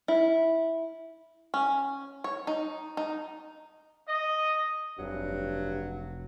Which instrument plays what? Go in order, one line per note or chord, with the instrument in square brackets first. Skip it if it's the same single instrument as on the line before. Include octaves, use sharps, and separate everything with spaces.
[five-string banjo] E4
C#4
C#5
D#4
D#4
[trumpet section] D#5
[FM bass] F1 [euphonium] G2 [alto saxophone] F#3